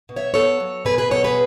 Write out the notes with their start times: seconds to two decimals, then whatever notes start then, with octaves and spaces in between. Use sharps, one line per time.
0.09 B2
0.16 C#5 E5
0.34 B3 A4 C#5
0.60 F#3
0.85 B2 G#4 B4
0.98 G#4 B4
1.11 B2 A4 C#5
1.24 G#4 B4